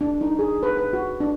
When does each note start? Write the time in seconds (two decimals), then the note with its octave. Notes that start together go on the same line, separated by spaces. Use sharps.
0.01 D4
0.21 D#4
0.39 G#4
0.63 B4
0.77 B4
0.93 F#4
1.20 D4